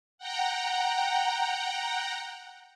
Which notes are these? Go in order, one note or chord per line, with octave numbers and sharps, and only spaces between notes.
F#5 G5 A#5